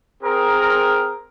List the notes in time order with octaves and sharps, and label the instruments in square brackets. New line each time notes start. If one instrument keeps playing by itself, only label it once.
[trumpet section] C4 G#4 A#4